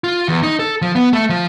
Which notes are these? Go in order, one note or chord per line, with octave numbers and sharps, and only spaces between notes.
F4
E2
D#4
A4
F3
B3
A3
F3